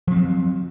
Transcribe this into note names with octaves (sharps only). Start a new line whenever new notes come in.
F3 F#3 C4